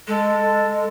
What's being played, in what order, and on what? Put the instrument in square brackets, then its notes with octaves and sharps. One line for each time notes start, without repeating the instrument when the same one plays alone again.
[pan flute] G#3 [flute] A4